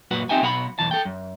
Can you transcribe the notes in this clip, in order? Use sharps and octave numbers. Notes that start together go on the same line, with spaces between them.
F#2 A#2 F#4 B4 F#5
C4 D#4 G4 E5 G5 G#5
B1 B2 F4 A#4 F#5 B5
B1 E2 E3 A5
A4 G5
F#2